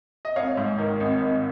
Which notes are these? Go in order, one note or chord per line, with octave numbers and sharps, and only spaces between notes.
D#5
G#1 C#5 F5
G#2
D#3
G#1
G#1